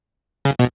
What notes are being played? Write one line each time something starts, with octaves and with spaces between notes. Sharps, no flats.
C#3
B2